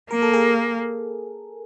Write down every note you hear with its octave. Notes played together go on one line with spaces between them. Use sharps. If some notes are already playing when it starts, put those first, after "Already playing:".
A#3 A#4
A4
G#4 A#4